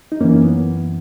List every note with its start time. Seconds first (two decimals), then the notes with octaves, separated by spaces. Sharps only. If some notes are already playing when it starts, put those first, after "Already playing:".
0.12 D#4
0.20 F#2 E3 A#3 C#4
0.43 B3